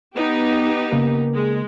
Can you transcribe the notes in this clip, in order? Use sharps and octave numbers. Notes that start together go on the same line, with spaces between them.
B3 D#4 G4
C#3 A#3 A#4
G#3